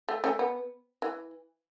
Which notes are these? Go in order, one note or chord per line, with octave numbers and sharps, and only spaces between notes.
A3
A3 C#4
B3
E3